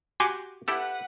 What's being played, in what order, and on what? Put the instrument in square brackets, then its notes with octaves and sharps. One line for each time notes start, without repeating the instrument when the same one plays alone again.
[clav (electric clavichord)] F#4 G4 F#5 [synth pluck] G#5 C6 D6
[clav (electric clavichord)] E4 G4 A4 [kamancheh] B4 F#5